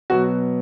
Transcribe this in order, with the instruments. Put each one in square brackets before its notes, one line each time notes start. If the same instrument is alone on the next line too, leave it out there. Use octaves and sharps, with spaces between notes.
[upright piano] B2 F#3 B3 F#4